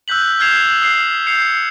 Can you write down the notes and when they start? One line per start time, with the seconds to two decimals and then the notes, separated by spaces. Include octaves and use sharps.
0.08 E6 F#6 G6 B6 F#7
0.40 F6 G6 G#6 C7 E7 F7
0.82 D#6 C7
1.27 G6 C7 C#7 F7